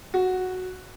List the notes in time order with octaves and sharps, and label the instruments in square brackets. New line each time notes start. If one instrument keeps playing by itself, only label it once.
[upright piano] F#4